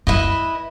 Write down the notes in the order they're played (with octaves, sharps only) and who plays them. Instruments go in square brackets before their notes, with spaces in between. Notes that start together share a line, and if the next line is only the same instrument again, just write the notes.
[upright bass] F#2 [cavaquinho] E4 B4 D#5